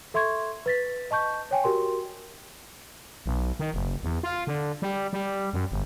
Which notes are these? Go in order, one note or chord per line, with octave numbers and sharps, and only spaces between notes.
A4 E5 C6 C#6 G#6
B4 A6 B6
D#5 A5 C#6 G6
C#5 G5 G#5
F#4 G4 A#4 C6
B1
D#3
F#1
E2
F4
D3
G3
G3
F#2
G1